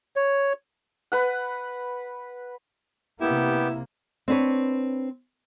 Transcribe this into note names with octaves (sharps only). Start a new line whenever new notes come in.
C#5
B4 F#5
C3 A#3 B3 E4 G4
C4 D4 B4 C#5